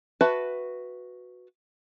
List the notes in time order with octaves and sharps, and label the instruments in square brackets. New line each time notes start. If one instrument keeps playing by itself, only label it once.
[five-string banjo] F#4 B4 E5 A5